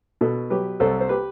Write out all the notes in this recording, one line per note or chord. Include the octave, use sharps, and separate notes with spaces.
B2 F#4 A4
F#3 G4 B4
C2 A4 C5
C5
G4 B4